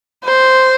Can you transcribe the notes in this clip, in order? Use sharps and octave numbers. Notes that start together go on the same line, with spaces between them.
C5